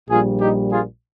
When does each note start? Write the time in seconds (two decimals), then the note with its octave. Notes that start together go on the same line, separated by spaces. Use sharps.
0.10 A#1 A#2 G3 F4 G#4
0.41 D#4 G4
0.72 F4 G#4